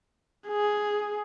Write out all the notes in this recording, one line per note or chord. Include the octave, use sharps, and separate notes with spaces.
G#4